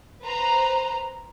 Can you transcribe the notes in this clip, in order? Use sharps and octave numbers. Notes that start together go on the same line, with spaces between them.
B4 C5 A#5